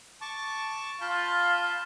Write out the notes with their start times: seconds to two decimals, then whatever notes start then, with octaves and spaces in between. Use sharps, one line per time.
0.21 A5 C#6 D6
1.01 F4 F5 A5 B5 G6